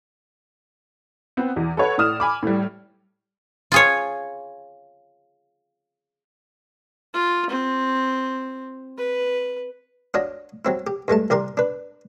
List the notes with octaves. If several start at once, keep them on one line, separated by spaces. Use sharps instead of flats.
B3 C4
E2
A4 B4 C#5 F#5
A2 D5 D#6 F6 E7
G#5 B5 D6
A2 G3
F4 G#4 C#5
F4
C4
B4
D4 F4 F#4 C#5 D#5
F#3 C4 E4
G4
G2 G#3 A3 A5
C2 G4 A#4 D5 C6
D4 B4